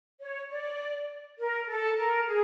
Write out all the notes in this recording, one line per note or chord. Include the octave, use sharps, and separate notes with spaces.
C#5
D5
A#4
A4
A#4
G#4